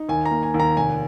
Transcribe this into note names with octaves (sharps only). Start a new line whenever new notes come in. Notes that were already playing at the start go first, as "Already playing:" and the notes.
Already playing: D#4
D#2 G#5
A#5
A#3
G#5
D#2
A#5
F1 G#5